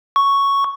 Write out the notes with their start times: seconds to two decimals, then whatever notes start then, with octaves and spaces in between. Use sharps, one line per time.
0.16 C#6